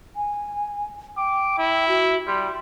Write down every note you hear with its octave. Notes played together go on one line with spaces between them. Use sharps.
G#5
G5 D6
E4
F#4
G3 C6